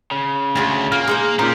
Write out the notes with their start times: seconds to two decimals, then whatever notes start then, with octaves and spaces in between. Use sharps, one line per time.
0.11 C#3
0.56 D2 G#3 F4 A#5
0.92 A#2 A#3 F6
1.08 G#3 D#4 C5
1.39 A#2 C#4 D#4 G4 C5 A#5